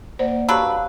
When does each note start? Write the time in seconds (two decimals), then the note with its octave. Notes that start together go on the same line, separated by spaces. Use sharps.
0.19 A#3 C5 D5 F#5
0.49 F#3 D4 G4 B4 F5 A#5 E6